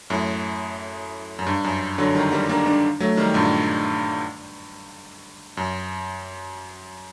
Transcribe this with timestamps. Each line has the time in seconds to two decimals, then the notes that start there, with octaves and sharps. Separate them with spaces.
0.10 F#2 A2
1.39 F#2
1.47 G2
1.64 F#2
1.98 D3 F#3
2.15 D#3 G3
2.32 G3 A#3
2.49 A#3 D4
2.66 A#3 D4
3.00 F#3 A3
3.17 D#3 G3
3.34 G2 A#2
5.57 F#2